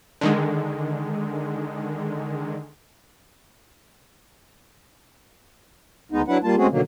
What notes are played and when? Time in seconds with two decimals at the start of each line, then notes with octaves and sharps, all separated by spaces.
0.21 D3 D#3 G#3
6.12 D2 G#3 B3 D#4
6.28 F#3 D4 E4 B4 F#5
6.43 G3 A#3 F4 A5
6.58 G#3 A3 C4 C#4 F#4 G#4
6.71 B2 D3 D#3 F#3 A#3